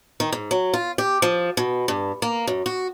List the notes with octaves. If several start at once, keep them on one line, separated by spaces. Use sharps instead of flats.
D#3
G#2
F#3
F4
G4
F3
B2
G2
A#3
F#2
F#4